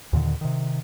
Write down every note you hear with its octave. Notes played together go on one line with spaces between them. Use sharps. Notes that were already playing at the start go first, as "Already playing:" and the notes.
D#2 A#2 D3 D#3
C3 D#3